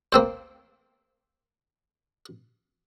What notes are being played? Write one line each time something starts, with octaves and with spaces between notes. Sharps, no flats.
A#3 C4 C5